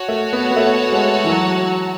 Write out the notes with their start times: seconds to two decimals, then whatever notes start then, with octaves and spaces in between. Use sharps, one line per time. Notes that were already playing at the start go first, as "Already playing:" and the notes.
Already playing: F#4 C#5 F#5 A5
0.08 A3
0.33 B3
0.51 B3
0.56 A3
0.92 G#3
1.24 E3
1.29 F#3